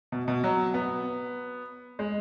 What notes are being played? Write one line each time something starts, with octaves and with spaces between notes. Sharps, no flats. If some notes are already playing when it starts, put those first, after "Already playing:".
B2
B2
F#3
B3
G#3